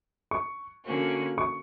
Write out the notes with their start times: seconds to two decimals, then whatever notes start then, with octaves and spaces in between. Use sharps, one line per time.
0.31 C#6
0.84 D3 A#3 C#4 F#4
1.38 C#6